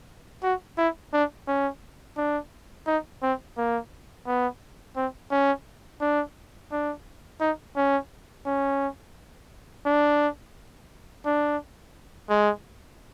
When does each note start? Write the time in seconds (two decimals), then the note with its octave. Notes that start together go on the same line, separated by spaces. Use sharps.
0.43 F#4
0.78 E4
1.13 D4
1.47 C#4
2.17 D4
2.87 D#4
3.22 C4
3.57 A#3
4.26 B3
4.96 C4
5.31 C#4
6.01 D4
6.71 D4
7.40 D#4
7.76 C#4
8.46 C#4
9.86 D4
11.25 D4
12.29 G#3